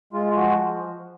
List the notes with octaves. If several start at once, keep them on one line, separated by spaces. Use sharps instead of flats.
G#3 F4
F3 F#4